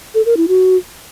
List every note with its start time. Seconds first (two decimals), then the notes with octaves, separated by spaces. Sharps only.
0.15 A4
0.26 A#4
0.37 E4
0.48 F#4